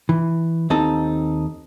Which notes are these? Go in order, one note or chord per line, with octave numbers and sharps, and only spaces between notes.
E3
D#2 C4 D#4 A4